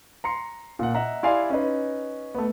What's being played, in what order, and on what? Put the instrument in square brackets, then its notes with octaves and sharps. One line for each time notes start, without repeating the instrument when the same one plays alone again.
[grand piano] A#5 C6 C#7
A#2 F#5
D#5 E5 F#5 A#5
E4 G4 D5 F5 G#5 C6
C#4 D#4 B4
A3 B3